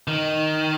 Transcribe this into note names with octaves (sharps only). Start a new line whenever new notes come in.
D#3